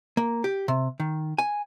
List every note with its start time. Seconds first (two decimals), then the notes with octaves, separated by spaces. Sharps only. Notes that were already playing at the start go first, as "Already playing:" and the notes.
0.17 A#3
0.44 G4
0.68 C3
1.00 D#3
1.38 G#5